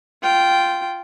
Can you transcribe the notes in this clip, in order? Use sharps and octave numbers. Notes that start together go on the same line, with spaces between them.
F4 G5